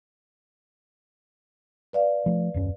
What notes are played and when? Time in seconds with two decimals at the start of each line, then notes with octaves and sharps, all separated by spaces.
1.93 B4 D5 F5
2.26 F3 A3
2.54 D#1 F#2 C#4